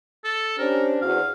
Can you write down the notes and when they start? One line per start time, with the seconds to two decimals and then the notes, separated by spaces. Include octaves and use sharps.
0.24 A4
0.58 C#4 D4 G4 A#4 C5
1.02 E2 F#4 F5